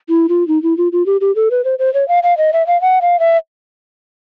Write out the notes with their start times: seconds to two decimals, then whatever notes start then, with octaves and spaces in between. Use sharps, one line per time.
0.09 E4
0.29 F4
0.48 D#4
0.63 E4
0.78 F4
0.92 F4
1.06 G4
1.21 G4
1.36 A4
1.51 B4
1.65 C5
1.79 C5
1.94 C#5
2.08 F5
2.23 F5
2.37 D#5
2.53 E5
2.67 F5
2.81 F#5
3.01 F5
3.20 E5